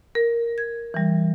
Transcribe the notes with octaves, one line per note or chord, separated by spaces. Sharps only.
A#4
G#6
E3 G3